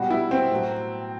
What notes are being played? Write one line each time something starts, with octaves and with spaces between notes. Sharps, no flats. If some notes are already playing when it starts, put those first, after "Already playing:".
Already playing: B2 G3 F#4
E4
C4
A2 F#3